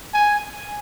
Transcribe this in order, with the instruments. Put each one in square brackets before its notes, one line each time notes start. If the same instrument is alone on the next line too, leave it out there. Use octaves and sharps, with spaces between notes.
[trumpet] G#5